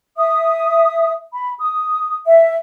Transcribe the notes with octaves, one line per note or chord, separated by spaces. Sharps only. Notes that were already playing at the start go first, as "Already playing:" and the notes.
E5 D#6
B5
D#6
E5